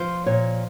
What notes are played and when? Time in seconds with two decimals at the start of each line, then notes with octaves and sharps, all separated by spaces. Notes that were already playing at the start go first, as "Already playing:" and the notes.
Already playing: F3 C5
0.26 A#2 C#5